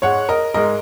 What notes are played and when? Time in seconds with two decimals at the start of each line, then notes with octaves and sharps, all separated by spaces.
0.02 G#2 G#3 C#5 F#5
0.29 A#4 D#5
0.54 G#2 G#3 A#4 D#5